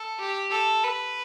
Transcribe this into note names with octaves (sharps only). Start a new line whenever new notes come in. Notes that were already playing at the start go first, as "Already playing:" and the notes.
Already playing: A4
G4
A4
B4